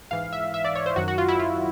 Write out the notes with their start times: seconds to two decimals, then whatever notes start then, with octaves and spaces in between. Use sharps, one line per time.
0.11 G#2 E3 F5
0.33 E5
0.54 E5
0.64 D5
0.75 C#5
0.86 C5
0.96 F#2 D#3 F#3 F#4
1.08 F#4
1.18 F4
1.28 E4
1.39 F4